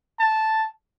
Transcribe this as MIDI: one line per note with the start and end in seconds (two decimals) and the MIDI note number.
0.20 0.68 81